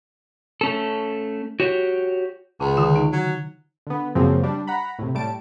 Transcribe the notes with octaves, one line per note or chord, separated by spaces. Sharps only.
A3 C#4 A4
F#4 G4 C#5
C#2 C#3
D3 D#3 F4
D#4
F#3
D3 B3
F#2 C#3 F3 F#3 A#3 C4
G3 D4
F#5 A#5 B5
A2 C3
A2 G3 A5 D7